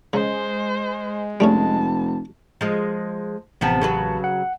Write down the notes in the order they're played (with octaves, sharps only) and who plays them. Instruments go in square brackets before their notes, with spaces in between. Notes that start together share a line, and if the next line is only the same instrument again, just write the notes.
[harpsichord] C#3 [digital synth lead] G#3 [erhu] C5
[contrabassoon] F1 [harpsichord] G3 A3 C#4 [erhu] A5
[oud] F3 G#3
[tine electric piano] A1 A5 [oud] C3 F3 B3
[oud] C#3 F#3 B4
[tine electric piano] F#5